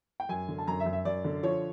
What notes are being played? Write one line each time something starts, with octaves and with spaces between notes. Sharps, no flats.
G5
F#2 G#5
D3
A5
F#2 A#5
E5
F#2
E5
F#2 D5
D3
F3 C#5